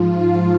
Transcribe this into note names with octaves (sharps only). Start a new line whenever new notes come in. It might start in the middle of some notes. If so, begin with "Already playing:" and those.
Already playing: G#2 F3 F4